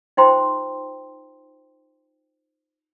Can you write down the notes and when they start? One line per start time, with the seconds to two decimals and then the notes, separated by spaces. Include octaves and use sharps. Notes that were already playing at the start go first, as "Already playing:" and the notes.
0.17 D#4 F4 C5 G5 A#5 C6